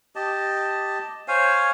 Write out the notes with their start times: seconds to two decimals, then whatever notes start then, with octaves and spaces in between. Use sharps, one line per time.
0.16 G4 D#5 A5
1.28 C5 C#5 F5 G#5